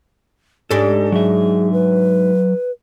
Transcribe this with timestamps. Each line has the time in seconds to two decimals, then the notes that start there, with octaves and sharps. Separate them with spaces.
0.71 G#2 D4 G4 A4
1.12 F#3 G#4 E5
1.73 B4